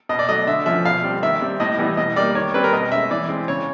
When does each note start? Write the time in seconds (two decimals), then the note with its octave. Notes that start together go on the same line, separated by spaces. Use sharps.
0.09 B2 D#5
0.19 D5
0.28 F#3 A3 D#5
0.47 D3 E5
0.66 F3 A3 C#4 E5
0.85 B2 F5
1.03 G3 C4
1.22 D#3 E5
1.41 G3 C4
1.60 A2 D#5
1.78 E3 G3 B3
1.97 B2 D#5
2.16 G3 A#3 D5
2.35 D#3 C#5
2.54 G3 C4 B4
2.64 A#4
2.73 B2 D#5
2.92 G#3 C#4 E5
3.11 E3 D5
3.29 G#3 C4
3.48 C#3 C#5